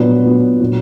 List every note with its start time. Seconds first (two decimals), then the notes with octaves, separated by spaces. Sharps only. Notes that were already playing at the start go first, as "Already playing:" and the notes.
Already playing: A#2 F#3 B3 D4
0.22 A#2 F#3 B3 D4
0.60 A#2 F#3 D4